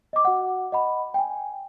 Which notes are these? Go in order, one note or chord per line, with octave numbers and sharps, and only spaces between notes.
D#5 D6
F#4 F#5
D#5 F#5 B5
G5 G#5